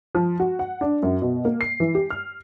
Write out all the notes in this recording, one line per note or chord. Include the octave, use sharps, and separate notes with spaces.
F3
F#4
F#5
D4
F#2
B2
A#3
C7
E3
G4
F6